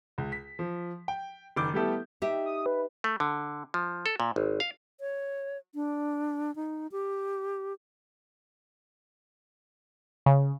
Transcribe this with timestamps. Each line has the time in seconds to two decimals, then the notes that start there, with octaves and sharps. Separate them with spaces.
0.18 C#2
0.32 B6
0.59 F3
1.08 G5
1.56 F#1 D#3 D6 G6
1.74 G3 A3 B3 E4 G4 A4
2.22 D#4 G4 E5
2.46 D#6
2.66 B4
3.04 A3
3.20 D3
3.74 F3
4.06 A4
4.20 A#2
4.36 G#1
4.60 F5
5.01 C#5
5.75 D4
6.56 D#4
6.92 G4
10.26 C#3